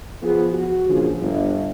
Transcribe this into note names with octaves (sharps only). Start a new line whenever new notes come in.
F3 B3 F4 G#4
F#4
A#2 C#3 F3 D4 G#4
G1